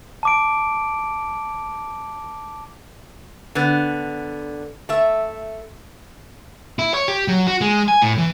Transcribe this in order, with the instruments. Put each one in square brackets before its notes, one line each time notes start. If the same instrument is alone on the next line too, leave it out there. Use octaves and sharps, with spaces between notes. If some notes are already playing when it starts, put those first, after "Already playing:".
[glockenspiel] A5 D6 D7
[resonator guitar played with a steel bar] D3 B3
A3 E5
[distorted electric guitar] E4
C#5
G4
F#3
F#4
G#3
G#5
A2
E3